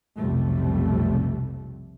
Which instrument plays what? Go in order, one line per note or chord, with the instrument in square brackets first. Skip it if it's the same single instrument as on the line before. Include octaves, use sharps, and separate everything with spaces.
[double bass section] B1 F2 A2 C3 G3 A3